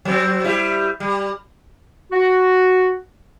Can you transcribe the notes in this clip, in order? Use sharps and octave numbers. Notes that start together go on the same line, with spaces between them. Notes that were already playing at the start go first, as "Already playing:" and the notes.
F#3 C4
G3 E4
G3
F#4